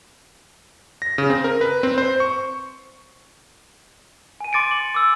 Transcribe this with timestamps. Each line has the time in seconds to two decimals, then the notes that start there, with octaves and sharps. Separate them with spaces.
1.02 A#6
1.18 C#3
1.30 C4
1.44 A#4
1.61 B4
1.83 C4
1.98 C5
2.20 C#6
4.40 G#5 D#7
4.53 C6 D6 A6 C#7 D7
4.71 F#7
4.94 D6 E6